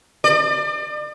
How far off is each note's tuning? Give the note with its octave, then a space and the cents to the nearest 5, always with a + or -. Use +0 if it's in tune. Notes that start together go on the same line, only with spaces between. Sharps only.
D5 +35